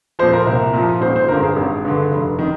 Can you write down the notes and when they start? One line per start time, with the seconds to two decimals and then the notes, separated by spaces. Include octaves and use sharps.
0.19 A#2 F3 C5
0.33 A#4
0.46 C2
0.74 A#2 F3
1.01 G#1 C5
1.16 C5
1.28 G2 D3 A#4
1.43 G#4
1.57 G#1
1.85 G2 D3
2.12 F1
2.39 D#3